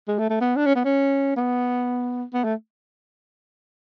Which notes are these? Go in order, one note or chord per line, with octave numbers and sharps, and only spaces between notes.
G#3
A3
A3
B3
D4
C#4
B3
C#4
B3
B3
A3